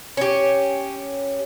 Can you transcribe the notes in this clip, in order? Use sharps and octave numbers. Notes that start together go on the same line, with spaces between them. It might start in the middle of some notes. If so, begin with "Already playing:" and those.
C#4 G4